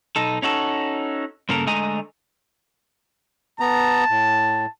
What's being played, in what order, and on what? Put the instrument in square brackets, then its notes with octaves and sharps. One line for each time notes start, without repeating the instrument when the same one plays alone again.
[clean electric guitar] B1 D#4 A4
C#4 D#4 F#4 A4
G2 C#3 A#3 A4 A#4
D3 G#3 A3 D#5 G#5 A#5
[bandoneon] B3 A#5 [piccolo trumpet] A5
[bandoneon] A2